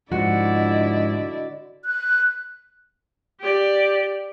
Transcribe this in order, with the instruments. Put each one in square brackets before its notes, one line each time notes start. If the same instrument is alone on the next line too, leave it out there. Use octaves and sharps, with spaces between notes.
[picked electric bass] G#2 F3 [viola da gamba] D3 E4 D5 [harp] F#4 [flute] D#5
[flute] F#6
[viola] G4 D5